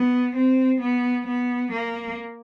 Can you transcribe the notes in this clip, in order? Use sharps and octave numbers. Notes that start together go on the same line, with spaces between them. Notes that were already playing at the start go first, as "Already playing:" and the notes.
Already playing: B3
C4
B3
B3
A#3